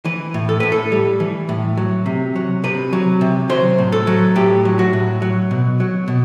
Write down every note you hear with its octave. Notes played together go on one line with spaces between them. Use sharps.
E3 B4
A2
A4
A2 B4
A4
G3
E3
A2
F#3
C3
F#3
C3 B4
F#3
C3
F#3 C5
A2
A4
F#3
A2 G4
F#3
F#4
A2
F#3
B2
F#3
B2